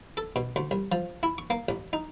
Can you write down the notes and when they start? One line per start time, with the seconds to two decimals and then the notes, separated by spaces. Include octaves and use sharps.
0.17 A4
0.36 B2
0.56 D2
0.71 C2
0.92 F3
1.23 E4
1.38 C#6
1.50 A#3
1.69 A1
1.93 D#4